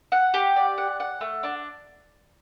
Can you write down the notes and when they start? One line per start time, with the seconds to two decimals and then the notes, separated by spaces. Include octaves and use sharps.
0.12 F#5
0.34 G4
0.56 D5
0.78 F#5
1.00 F#5
1.21 A3
1.43 D4